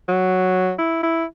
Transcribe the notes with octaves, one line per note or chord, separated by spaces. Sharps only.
F#3
E4
E4